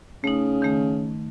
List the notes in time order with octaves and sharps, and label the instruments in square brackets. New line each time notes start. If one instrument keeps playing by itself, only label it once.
[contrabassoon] C#3 [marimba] A3 D#4
[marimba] D#3 A3